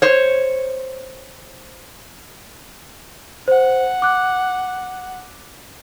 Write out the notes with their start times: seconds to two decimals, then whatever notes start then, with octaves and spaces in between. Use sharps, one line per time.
0.02 C5 C#5
3.48 C5 F#5
4.02 D6 F#6